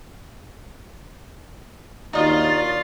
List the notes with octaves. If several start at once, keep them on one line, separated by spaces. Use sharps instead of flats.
D#2 F#3 D4 D#4 F4 D5 D#5